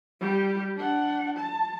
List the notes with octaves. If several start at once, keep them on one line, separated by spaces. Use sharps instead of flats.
G3 G4
D4 F#5
A5